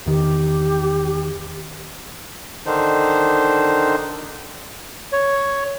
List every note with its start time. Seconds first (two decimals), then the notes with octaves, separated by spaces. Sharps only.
0.06 E2 D#3 G4
2.66 D3 D#3 D4 D#4 C5
5.12 C#5